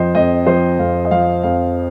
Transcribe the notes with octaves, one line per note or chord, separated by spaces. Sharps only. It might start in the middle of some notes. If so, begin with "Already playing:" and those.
Already playing: F2 F3 C5 D#5 G5
F2 D#5
F3 C5
F2 F5
D#5
F3 F5
F2 F5